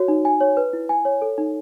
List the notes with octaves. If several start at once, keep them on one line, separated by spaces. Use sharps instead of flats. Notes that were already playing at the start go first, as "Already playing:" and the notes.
Already playing: F#4 C#5
D#4
G#5
C#5
B4
E4
G#5
C#5
A4
D#4